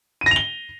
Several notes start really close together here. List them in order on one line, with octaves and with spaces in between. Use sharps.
D#7 A#6 F7 G7